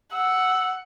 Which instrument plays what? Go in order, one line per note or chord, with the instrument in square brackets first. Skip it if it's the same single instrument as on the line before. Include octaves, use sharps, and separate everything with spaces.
[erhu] F#5 [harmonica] E6